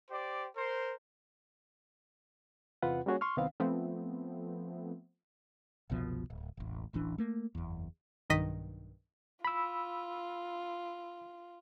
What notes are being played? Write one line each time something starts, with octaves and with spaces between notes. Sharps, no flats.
G4 C5 D5
A#4 C5
E2 C3 C4 F4 B4 F#5
G3 A#3 C#4 F#4 G#4 C#5
C6 C#6 F6
C2 D#3 B3 C4 F5
F3 A3 B3 C4
F#1 C2 B2 F3
D1
E1 A1
D1 A1 E3 D4
A3 A#3
F#1 E2
B1 G2 D#3 D#5 D#6 B6
F4 B5 E6